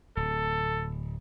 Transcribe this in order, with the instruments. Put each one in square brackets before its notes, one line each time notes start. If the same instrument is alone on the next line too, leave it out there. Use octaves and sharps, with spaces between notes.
[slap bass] D1 [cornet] A4